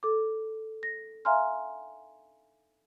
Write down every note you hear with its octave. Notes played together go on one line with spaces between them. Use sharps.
A4 D6
A#6
E5 F5 G#5 A#5 C6 F6